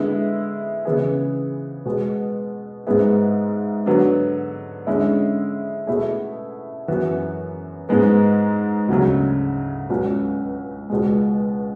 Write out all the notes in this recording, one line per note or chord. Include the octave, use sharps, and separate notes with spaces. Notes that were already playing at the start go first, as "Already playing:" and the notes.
Already playing: D3 G#3 B3 E4
C#3 E3 B3 E4 G#4
B2 G#3 B3
G#2 G#3 B3 E4 G#4
D3 F#3 B3 F#4
D3 G#3 C#4 E4
B2 A3 E4 G#4
F#2 E3 B3 F#4
G#2 G#3 B3
D2 C#3 F#3
C#2 B2 F#3 C#4 F#4
C#2 B2 G#3